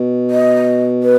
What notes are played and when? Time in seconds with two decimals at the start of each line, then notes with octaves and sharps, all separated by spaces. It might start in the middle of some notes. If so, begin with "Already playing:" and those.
Already playing: B2
0.31 D#5
1.03 B4